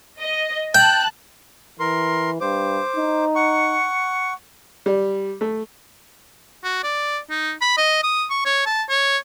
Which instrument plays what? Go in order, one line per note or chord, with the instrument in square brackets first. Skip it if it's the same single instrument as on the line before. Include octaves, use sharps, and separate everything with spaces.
[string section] D#5
[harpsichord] G5 [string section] A5 F#6
[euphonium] E3 [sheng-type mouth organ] A#4 C6
[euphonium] G2 [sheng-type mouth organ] C5 D6
[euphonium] D#4
[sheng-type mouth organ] F#5 C#6
[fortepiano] G3
A3
[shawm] F#4
D5
D#4
B5
D#5
D#6
C#6
C#5
A5
C#5